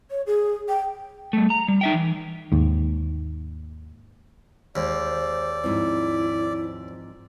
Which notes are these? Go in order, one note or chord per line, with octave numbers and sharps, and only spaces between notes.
C#5
G#4
G5
G3 A3
A#5
G3
D#4 E5 G5
E3
D#2 G#2
D#2 G#3 C5 D5
G#2 F3 C4 E4